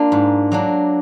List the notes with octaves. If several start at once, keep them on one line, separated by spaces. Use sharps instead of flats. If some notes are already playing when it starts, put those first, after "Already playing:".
Already playing: A#3 D4 F4
G#2
F#3 A#3 D4